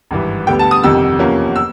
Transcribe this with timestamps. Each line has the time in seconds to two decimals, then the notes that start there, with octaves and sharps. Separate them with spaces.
0.11 G#1 G2 E3
0.47 D2 D3 G3 B3 G5
0.59 A5
0.71 D#6
0.83 G1 F2 C3 D#3 G3 E6
1.19 E2 C3 F3 A#3 C#4
1.56 E6